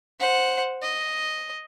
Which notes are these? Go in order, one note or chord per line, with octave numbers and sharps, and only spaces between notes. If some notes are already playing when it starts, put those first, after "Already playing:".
C5 F#5
D#5